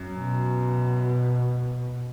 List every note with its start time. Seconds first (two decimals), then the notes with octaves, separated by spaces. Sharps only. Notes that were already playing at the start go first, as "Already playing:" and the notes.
Already playing: F#2
0.16 B2